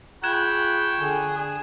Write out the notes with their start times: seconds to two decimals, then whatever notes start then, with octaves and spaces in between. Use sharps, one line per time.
0.24 F4 G#4 G5 B5 C#6 F#6 G#6 E7
1.00 D3 G#4